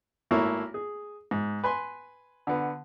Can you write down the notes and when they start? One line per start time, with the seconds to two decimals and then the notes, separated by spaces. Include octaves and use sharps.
0.31 G#1 A3 A#3 E4 C#5 A#5
0.74 G#4
1.31 G#2
1.64 B4 G#5 C6
2.47 D3 B3